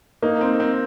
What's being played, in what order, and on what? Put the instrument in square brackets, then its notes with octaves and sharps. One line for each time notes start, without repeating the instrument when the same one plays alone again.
[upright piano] A#3 [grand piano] D#4
[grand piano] C4
C4